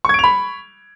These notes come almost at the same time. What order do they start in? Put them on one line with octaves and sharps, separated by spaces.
C#6 G#6 D7 F7 B5